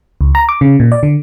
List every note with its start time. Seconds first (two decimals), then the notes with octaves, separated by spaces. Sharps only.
0.21 C#2
0.35 A#5
0.49 D6
0.61 C#3
0.80 A#2
0.92 D5
1.03 D3